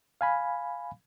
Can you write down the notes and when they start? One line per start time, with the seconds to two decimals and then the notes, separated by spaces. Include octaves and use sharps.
0.21 F5 G#5 B5